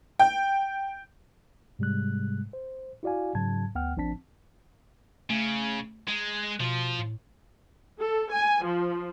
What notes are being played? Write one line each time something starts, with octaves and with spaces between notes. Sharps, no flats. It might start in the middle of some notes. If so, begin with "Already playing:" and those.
G5
G#2 C3 G3 G#3 F#6
C5
E4 F#4 D5 F5 G#5
G#2 C#3 F#3 A5 G#6
D2 B3 F#5 G5 F6
A1 F3 C4 D4 A5 B6
C#3 A3
G#3 A#5
F#6
B2 F3 F4
A2
A4
G#5
F3